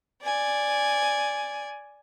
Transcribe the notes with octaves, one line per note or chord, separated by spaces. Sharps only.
D5 G#5